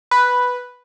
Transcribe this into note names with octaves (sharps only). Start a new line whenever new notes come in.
B4